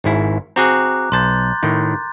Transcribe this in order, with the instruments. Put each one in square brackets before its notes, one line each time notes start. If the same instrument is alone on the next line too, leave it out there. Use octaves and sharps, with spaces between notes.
[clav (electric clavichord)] G#1 G#2 E4
[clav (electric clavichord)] C4 F#4 G#4 [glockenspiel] A#5 D6 F#6
[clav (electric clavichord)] B1 A5 [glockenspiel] C6 G6 A6
[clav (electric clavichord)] A2 D#3